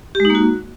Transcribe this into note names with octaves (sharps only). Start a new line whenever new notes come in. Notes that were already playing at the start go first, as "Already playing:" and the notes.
G4
G#3
D#4
A#3
F#4